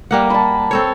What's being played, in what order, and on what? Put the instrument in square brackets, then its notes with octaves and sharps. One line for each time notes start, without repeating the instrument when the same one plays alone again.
[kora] G3 A#3 F#5
[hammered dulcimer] A5 B5
[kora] C4 A4 C#5